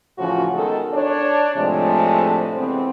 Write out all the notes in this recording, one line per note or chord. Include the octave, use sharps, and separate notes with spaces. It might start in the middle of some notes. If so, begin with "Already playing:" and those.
A2 C#3 E3 F3 C#4 F#4
D#3 G#3 B3 A4
D4 C#5 D5
A2 C3 F3 G#3 A3 D4
E3 G#3 B3 C4